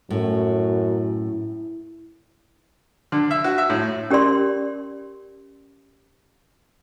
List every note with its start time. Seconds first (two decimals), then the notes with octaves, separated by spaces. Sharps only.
0.10 F#2 A2
3.12 D3
3.31 E5
3.44 F#4
3.58 E5
3.70 A2
4.10 C#4 G4 A#4 D5 C6